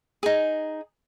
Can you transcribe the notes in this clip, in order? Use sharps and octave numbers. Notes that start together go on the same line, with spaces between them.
D#4 G#4